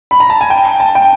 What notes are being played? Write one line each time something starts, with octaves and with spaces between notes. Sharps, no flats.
B5
A#5
A5
G#5
G5
A5
G5